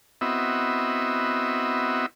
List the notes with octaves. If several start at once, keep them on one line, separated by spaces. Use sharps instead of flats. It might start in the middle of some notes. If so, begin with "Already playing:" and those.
B3 C4 E4 F#4 D#5 E5